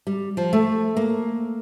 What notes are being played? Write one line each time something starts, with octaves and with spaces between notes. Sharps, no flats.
G3
F3
A3
A#3